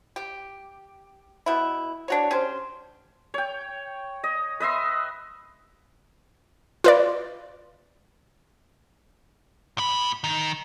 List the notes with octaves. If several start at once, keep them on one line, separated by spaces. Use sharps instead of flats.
G4
B2 E4
D4 F#4 C#5
C#4 G4 C5
C#5 G5
D#5
B4 D#5 E5 C6
F4 B4 D5
A2 B5
D#3